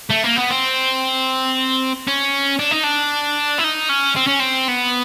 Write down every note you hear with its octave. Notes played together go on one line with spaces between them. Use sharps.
A3
A#3
B3
C4
C#4
D4
D#4
D4
E4
D#4
C#4
C4
C#4
C4
B3